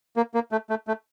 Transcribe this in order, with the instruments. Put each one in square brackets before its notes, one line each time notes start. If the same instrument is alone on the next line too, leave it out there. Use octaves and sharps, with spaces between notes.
[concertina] A#3
A#3
A3
A3
A3